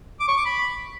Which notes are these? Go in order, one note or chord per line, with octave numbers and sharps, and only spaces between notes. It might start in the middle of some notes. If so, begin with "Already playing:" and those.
D6
C#6
D6
B5